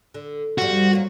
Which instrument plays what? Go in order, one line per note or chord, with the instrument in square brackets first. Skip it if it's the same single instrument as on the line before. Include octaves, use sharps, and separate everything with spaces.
[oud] D3
[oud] G2 F3 G3 [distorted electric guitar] F#4
[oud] F#3 A#3 F4